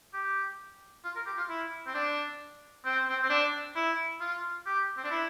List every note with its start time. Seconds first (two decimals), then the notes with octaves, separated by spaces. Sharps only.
0.13 G4
1.04 F4
1.16 A#4
1.26 G4
1.37 F4
1.49 E4
1.87 C4
1.94 D4
2.85 C4
3.09 C4
3.22 C4
3.30 D4
3.76 E4
4.20 F4
4.66 G4
4.97 C4
5.04 D4
5.11 E4